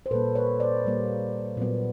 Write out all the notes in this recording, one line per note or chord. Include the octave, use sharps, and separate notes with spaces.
C5
A#2 G3 A#3 A4 B4
B4 C#5
C5 D5
A#2 G3 A#3
A#2 F#3 B3